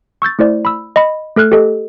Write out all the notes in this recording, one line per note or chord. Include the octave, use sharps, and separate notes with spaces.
C#6 E6 G6 A6
A3 E4 C5 D5
B5 E6
D#5 B5
A3 A4 F6 F#6
G4 A4 D#5